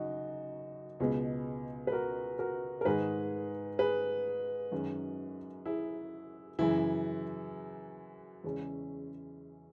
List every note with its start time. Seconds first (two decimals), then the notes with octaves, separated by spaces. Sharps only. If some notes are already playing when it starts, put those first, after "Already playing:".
Already playing: F#1 F#2 D#4 F#4
1.00 C#2 B2 G#3 B3
1.87 B4
1.92 F#4 A#4
2.39 F#4 A#4
2.81 A#4
2.85 G#2 D#3 G#3 G#4 B4
3.79 G#4 B4
4.72 F#2 D#3 G#3 C#4
5.66 E4 G#4
6.59 F#2 C#3 E3 E4
8.44 E2 C#3 G#3 C#4